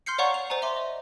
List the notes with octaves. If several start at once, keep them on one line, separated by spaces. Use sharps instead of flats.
C6 F6 G6 C7 C#7
C#5 D5 F5 F#5 A#5 C#6
F7
C5 D5 G#5 A#5
E5 A#5 C6 D6
D#5